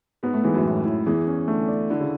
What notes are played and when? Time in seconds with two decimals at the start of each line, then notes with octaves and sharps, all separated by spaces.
0.23 G#2 G#3 B3
0.33 A2 A3
0.44 G#2 E3 G#3
0.54 F#2 F#3
0.65 A2
0.85 E4
1.06 E2 E3 G#4
1.27 C#4
1.48 D3 A3
1.68 D5
1.90 D3 E4
2.00 C#3